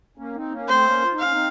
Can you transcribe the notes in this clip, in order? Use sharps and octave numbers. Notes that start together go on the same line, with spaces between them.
A#3 C#4
C4 D#4
A#3 C#4
A3 C4 C5
A#3 C#4
F4
D#4
C#4 F5
C4 D#4